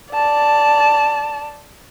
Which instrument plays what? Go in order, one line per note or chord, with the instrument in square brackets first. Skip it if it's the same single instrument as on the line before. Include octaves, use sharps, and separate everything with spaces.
[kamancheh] D5 A5